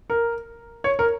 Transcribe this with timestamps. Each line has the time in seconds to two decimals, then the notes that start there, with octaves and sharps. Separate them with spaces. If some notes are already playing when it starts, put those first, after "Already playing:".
0.10 A#4
0.84 C#5
0.99 A#4